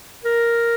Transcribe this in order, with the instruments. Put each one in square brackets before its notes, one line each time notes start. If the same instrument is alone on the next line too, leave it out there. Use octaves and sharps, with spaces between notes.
[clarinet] A#4